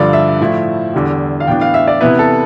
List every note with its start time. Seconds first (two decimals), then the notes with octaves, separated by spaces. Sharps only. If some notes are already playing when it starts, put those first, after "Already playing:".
Already playing: G2 D3 F3 D5
0.13 E5
0.40 A2 F3 A3 E4
0.93 E2 D3 G3
1.40 F5
1.47 A2 E3 B3 D4 G5
1.61 F5
1.74 E5
1.87 D5
2.01 C3 E3 B3 E4 B4
2.19 A4